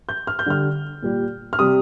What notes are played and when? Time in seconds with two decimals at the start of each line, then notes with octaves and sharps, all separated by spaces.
0.09 G6
0.27 F6
0.39 G6
0.46 D3 G3 F6
1.02 A#2 G3
1.53 F6
1.59 C3 G3 D#6